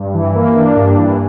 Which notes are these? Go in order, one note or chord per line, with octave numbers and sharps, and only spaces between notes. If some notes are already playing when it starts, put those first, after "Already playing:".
Already playing: G2
E3
A#3
D4
G2
E3